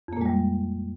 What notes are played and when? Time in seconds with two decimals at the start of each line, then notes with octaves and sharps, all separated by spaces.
0.08 F2
0.13 A#3
0.17 A#2
0.21 G#3
0.26 G3